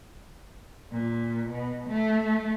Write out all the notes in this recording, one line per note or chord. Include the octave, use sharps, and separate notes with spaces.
A#2
B2
A3